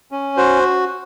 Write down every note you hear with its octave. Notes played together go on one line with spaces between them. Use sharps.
C#4
F#4 C5